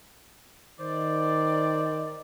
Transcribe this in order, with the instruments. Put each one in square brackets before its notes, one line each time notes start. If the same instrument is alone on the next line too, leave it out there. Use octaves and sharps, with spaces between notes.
[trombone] D#3 [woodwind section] C5 D5